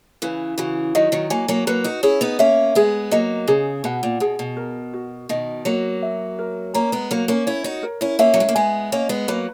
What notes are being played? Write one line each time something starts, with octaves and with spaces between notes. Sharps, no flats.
C#3 E3 B4
C#3 E3 F#4
D#3 F#3 D#5
D#3 F#3
F#3 A#3 G#5
F#3 A#3
F#3 A#3 B4
D#4 F#4
C#4 E4 G#4
B3 D#4
A#3 C#4 E5
G#3 B3 G#4
F#3 A#3 D#5
C#3 G#4
B2 F#5
A#2
B2 G#4
B2
A#4
F#4
B2 D#3 D#5
F#3 A#3 F#4
E5
A#4
A#3 C#4 A#5
G#3 B3
F#3 A#3 A#4
A#3 C#4
C#4 E4 C#5
D#4 F#4
A#4
C#4 E4
A#3 C#4 E5
F#3
G#3
A#3
G#3 B3 G#5
A#3 C#4 D#5
G#3 B3
F#3 A#3 B4